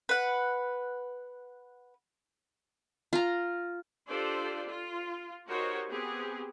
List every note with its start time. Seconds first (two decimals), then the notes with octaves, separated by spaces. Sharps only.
0.09 B4 F#5
3.13 F4 A#5
4.08 D4 F4 G4 A4 C5 D5
4.67 F4
5.48 D#4 F#4 G4 A#4 C5 C#5
5.88 B3 C4 G4 G#4